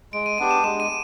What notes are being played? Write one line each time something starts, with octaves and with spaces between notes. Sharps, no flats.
G#3 D7
D#7
B3 D4 G4 D#7
E7
G#3 E7
D#7